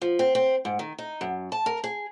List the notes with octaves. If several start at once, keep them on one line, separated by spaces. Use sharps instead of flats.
F3
C4
C4
G#2
D#3
D#4
F#2
A5
A#4
G#4